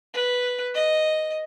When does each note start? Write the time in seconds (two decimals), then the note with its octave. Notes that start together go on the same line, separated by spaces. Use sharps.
0.14 B4
0.75 D#5